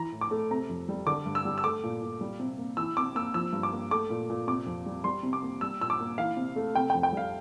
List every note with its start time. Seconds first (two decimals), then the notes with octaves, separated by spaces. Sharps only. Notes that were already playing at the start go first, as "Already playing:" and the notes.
Already playing: E3 A#5
0.12 A2
0.21 D6
0.31 A3
0.51 C3 A#5
0.69 F2
0.89 G3
1.07 D3 D6
1.26 G2
1.35 E6
1.45 G3
1.58 E6
1.64 A3 D6
1.83 A#2
2.02 A#2
2.21 G3
2.40 C3
2.58 A#3
2.77 E3 E6
2.97 C3 D6
3.15 A#3 E6
3.34 F3 E6
3.53 G2
3.63 D6
3.72 A#3
3.91 A3 D6
4.10 A#2
4.30 A#2
4.47 C3 D6
4.66 F2
4.86 G3
5.04 G3 C6
5.23 C3
5.33 D6
5.43 A#3
5.61 G3 E6
5.81 A#2 E6
5.90 D6
6.00 A#3
6.18 E3 F5
6.37 C3
6.56 A3
6.75 C3 G5
6.90 G5
6.95 F2
7.03 G5
7.13 G3 F5